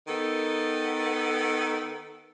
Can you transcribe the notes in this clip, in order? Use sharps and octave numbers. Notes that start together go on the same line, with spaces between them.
D#3 B3 A4